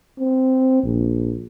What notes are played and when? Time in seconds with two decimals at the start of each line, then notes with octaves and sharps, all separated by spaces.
0.19 C4
0.83 A#1